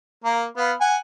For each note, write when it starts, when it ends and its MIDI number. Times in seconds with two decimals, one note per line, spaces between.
0.24 0.45 58
0.24 0.45 70
0.57 0.73 59
0.57 0.73 77
0.57 0.73 83
0.81 0.97 78
0.81 0.97 80